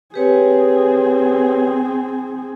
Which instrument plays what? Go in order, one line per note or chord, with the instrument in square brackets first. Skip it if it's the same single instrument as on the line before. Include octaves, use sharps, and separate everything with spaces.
[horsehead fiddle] C4 G#4 [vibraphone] G4 B4 C#5